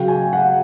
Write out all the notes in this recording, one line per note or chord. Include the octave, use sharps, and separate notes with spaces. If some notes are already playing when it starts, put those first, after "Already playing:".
Already playing: C#3 F#3 G5
G#5
F#5